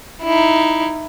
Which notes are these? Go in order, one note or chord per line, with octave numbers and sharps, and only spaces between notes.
D#4 E4